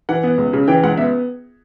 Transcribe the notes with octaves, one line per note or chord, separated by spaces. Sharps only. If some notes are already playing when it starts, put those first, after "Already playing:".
E3 F#5
B3
C#2
C#3
E3 G5
C#2 F#5
B3 E5